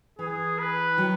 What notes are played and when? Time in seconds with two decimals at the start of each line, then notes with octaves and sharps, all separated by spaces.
0.19 E3 G#4
0.59 B4
0.98 D#3 F#3